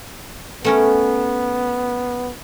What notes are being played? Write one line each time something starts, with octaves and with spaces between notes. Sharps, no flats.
A3 B3 C#4 A#4